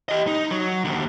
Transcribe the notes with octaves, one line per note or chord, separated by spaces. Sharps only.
G4 D#5
D#4
F#3
D#2 D3